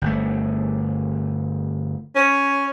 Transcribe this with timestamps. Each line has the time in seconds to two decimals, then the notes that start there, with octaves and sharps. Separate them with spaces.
0.02 G1 A3
2.16 C#4